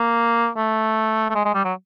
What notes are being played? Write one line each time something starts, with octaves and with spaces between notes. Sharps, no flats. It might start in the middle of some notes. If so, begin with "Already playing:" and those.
Already playing: A#3
A3
A3
G#3
G#3
G3
F#3